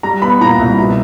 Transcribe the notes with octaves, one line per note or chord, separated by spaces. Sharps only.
G3 A#5
B3 B5
A#2 A#5
C2
B2